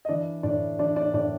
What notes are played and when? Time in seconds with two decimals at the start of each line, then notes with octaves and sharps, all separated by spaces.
0.05 D#5
0.09 E3 D4 D5
0.43 A2 D4 D5
0.79 E3 D4 D5
0.96 D4 D5
1.13 A2 D4 D5